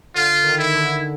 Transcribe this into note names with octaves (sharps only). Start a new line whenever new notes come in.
D3 F4
D#3
E4
D3